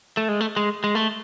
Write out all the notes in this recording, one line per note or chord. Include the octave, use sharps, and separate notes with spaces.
A3
G#3
A3
G#3
G#3
A3